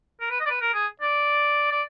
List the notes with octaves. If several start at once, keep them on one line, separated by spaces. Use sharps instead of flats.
A#4
B4
D#5
D5
B4
A#4
G#4
D5
D5